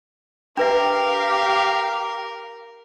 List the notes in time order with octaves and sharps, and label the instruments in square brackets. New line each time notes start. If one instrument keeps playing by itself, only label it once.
[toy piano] D4 B4 E5 [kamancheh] G4 F5 [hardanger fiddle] A#4